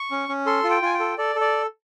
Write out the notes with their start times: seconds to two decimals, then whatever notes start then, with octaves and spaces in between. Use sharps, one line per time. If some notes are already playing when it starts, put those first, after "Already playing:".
Already playing: C#6
0.11 C#4
0.29 C#4
0.46 A4 C6
0.64 F4
0.70 G5
0.82 F4 G#5
0.94 G5
1.00 A4
1.18 A4 D5
1.35 A4
1.41 D5